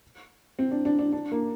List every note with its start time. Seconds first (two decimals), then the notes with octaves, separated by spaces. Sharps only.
0.59 C4
0.71 D4
0.85 D4
0.99 D4
1.12 D4
1.32 A#3